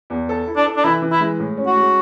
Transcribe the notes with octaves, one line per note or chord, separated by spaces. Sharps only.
E2
A4
E4
D4
A4
D4
E3 E4
E3
E4
G#3
A2
C#4
F#4
G#3